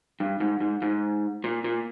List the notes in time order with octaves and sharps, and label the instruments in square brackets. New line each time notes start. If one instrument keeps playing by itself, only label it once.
[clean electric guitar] G2
G#2
G#2
G#2
A#2
A#2